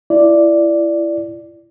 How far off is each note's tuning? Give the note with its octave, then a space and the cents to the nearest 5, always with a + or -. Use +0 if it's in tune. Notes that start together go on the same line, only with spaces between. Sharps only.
E4 +25 D5 +0